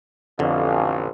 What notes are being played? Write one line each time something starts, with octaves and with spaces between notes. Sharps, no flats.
A1 F2 D3 D#4 D#5 F5